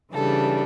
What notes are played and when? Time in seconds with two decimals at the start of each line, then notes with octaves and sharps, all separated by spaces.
0.13 C#3 E3 G3 D4 A4